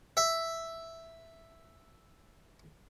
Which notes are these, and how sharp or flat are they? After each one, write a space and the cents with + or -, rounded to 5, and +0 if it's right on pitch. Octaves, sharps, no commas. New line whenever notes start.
E5 +0